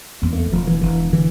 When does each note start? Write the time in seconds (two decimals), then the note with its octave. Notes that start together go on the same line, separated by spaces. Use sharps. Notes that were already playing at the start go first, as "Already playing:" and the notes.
0.22 E2 A#3
0.33 A#3
0.38 A3
0.51 E1 F3
0.67 E3
0.82 E1 E3
1.13 D3 E3